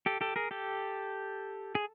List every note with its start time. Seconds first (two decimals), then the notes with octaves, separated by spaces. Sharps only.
0.06 G4 A4
0.21 G4 A4
0.36 G#4 A#4
0.51 G4 A4
1.75 G#4